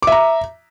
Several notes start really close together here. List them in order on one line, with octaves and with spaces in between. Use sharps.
D6 E5 A#5